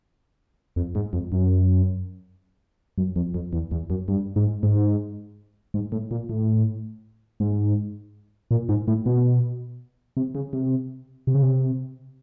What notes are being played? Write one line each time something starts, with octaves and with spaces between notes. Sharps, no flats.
F2
G#2
F2
F#2
F#2
F2
F2
E2
E2
F#2
G2
G#2
G#2
G#2
A2
A#2
A2
G#2
A#2
G#2
A2
B2
C3
C#3
C3
C3
C#3
C3